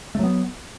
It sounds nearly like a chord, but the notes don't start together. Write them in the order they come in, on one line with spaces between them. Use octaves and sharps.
A3 F#3 B3